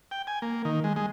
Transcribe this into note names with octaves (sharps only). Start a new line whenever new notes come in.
G5
G#5
A#3
D#3
G#3
G#3